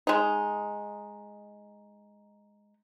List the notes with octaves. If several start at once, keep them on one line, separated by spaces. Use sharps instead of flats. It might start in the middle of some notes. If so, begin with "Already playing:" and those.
G#3 D#4